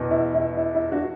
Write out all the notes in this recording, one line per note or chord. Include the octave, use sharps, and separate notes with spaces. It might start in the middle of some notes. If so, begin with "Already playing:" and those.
Already playing: E2 B2
E4
E4
E4
E4
D4 F#4